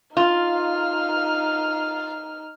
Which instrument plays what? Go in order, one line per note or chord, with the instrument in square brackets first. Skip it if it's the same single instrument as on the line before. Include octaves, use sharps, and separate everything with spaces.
[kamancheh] D#4 F6 [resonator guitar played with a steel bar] F4